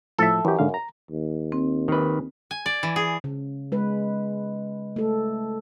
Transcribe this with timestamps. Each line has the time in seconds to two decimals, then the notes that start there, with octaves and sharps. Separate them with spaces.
0.19 A2 F3 A4 E5
0.45 F#2 E3 G4
0.59 G#2 D3 F5
0.74 A#5
1.10 D#2
1.52 C4
1.88 D#3 B4
2.51 G#5
2.66 D5
2.83 E3
2.96 G#4
3.24 C#3
3.72 G#3 B4
4.96 A3 A4